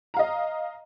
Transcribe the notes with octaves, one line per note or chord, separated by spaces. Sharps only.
D#5 F5 A#5